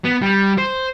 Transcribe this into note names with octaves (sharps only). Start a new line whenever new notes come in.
B3
G3
C5